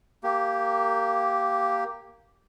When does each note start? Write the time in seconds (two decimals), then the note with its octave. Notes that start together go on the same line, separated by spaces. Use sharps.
0.23 A#3 G4